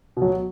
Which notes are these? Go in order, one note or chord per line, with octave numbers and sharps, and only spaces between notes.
B2 F#3